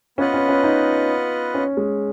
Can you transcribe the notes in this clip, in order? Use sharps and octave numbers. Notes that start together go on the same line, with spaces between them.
B3 C#4 F4 B4 D#5 F#5
C#4
C#4
D#4
C#4
G#3